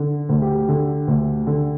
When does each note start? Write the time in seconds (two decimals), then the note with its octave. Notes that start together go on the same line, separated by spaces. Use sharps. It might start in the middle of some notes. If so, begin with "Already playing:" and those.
Already playing: D3
0.29 D2
0.42 G4
0.68 D3
1.08 D2
1.47 D3